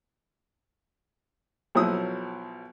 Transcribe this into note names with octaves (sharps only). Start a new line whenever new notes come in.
B1 F3 F#3 E4 D#6 E6